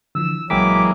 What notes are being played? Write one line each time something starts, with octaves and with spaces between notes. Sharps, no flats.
D3 E3 F3 E6
A#1 E3 F#3 G#3 A#3 G5 D6 B6